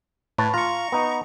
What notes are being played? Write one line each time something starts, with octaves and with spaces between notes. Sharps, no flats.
A2 B4 C#5 A5
F4 A#5 C#6
B3 D#4